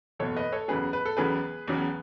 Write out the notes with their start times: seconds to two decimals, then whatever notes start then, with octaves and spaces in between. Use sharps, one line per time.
0.19 F#1 E2 B2 A4 C#5
0.36 B4 D#5
0.52 A4 C#5
0.68 E1 E2 C#3 F#3 G#4 B4
0.93 B4
1.05 A4
1.17 E1 E2 C#3 F#3 G#4 B4
1.67 E1 E2 C#3 F#3